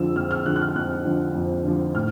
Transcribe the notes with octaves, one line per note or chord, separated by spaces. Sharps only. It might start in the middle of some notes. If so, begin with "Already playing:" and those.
Already playing: F2 D3 F3 E6
F2 F6
F6
D3 F3 F#6
F#6
F6
F2 F#6
D3 F3
F2
D3 F3
A2 F6